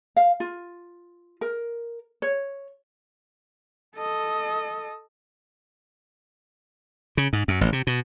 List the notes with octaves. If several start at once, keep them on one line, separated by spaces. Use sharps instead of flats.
F5
F4
A#4
C#5
A4 D#5
C#3
G#2
F#2
A1
C3
B2